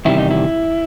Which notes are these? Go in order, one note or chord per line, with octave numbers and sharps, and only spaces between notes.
E2 C3 D#3 G3 E4
D#4
E4